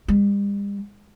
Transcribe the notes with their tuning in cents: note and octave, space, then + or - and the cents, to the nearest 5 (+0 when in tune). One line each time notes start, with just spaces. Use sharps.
G3 +45